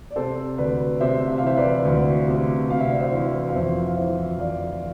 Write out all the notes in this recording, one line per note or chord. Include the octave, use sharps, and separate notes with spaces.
D5
C3 A4 C5
D2 B4 D5
C3 C5 E5
E5
F5
E3 C5 E5
B4 D5
D2
C3
C3 F5
E5
D5
C5 E5
E3
F5
F2 C5 E5
F5
E3 C5 E5
F2 D5 F5